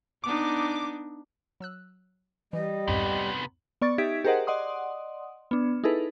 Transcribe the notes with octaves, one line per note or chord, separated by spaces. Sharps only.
B3 D4 D#4 D6
F#3 E6 F#6
E3 G3 D#5
C2 F2 G#2 C3 B3
B3 D5 C#6 A6
D#4 G4 E5 G#6 B6 D7
G4 G#4 A#4 C5 D#5 F#5
D5 D#5 F#5 C6 D#6
B3 D4
D#4 E4 G#4 A4 B4